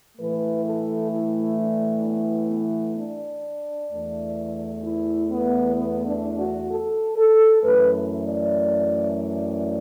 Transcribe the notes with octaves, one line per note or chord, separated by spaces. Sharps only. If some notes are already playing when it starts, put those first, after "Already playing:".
A2 E3 A3 B4
A4
E4
D4
B3
B3
D4
E2 E3 A3
E4
B3
B3
D4
F#4
A4
A4
F#2 E3 A3 B4
D5